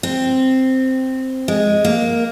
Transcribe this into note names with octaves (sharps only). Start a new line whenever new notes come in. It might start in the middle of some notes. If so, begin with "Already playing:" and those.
C4
G#3
A#3